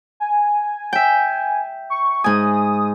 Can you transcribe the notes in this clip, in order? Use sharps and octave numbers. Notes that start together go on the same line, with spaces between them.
G#5
E5 G5
C#6
G#2 G#5 D#6